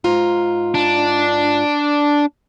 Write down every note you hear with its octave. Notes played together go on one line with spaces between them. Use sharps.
G#2 F4 A#5
D4